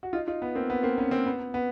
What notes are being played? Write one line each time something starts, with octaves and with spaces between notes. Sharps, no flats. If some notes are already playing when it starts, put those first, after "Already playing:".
F#4
D#4 F4
D#4 F4
B3
A#3 C4
B3
A#3 C4
B3 C#4
A#3 C4
B3
B3